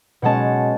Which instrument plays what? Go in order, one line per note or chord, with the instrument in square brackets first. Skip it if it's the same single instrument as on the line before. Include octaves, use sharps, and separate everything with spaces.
[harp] B2 G#3 C#4 F#5 A5